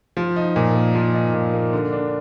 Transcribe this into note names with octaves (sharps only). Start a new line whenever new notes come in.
F3
D#4
A#2
A#3
F3
D#4
A#2
A#3
D3
D4